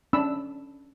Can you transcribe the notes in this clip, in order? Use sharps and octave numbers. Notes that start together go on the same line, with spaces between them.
C#4 D4 B5 E6